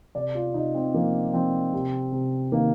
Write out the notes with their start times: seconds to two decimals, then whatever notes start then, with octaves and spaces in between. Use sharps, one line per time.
0.15 C3 D5
0.35 F4
0.54 C3 D#4
0.74 C4
0.94 F3 A#3
1.34 F3 C4
1.73 C3
2.12 C3
2.52 D#3 A#3